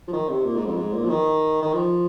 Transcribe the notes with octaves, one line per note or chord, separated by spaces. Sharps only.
F3
D#3
C3
A#2
G#2
F2
G#2
A#2
F3
D#3
D#3
F3